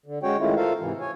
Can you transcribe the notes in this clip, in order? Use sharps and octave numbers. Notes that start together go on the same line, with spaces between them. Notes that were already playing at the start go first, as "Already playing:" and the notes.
D3
G#3 C#4 F#4 C#5 G5
D#3 G#3 A3 C#4 E4 F4
F4 A4 A#4 C5 F5
G#2 C3 E3
C#5 G#5